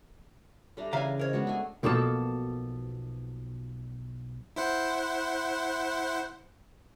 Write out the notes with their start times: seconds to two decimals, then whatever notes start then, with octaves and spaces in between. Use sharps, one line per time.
0.77 G3 D4 A4 E5 A#5
0.93 C#3 E3 C#5 D5 E5 F5 G#5 A#5
1.19 A#4 C5 C#5 D#5
1.33 G#3 B3 D4 F#4
1.47 A3 G#4 G#5
1.83 B1 B2 F3 A#3 A4 A5
4.56 E4 C5 F#5